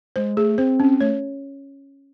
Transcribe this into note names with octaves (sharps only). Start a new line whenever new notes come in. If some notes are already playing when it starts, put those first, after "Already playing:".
G#3 C5
A3 G#4
C4 C5
C#4
A3 C#5